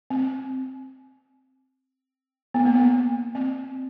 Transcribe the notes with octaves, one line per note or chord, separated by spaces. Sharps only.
C4
B3
A#3
B3
C4